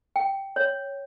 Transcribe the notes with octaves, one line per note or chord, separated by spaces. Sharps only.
G5
C#5